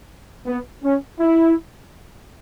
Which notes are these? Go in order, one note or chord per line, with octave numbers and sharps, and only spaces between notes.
B3
C#4
E4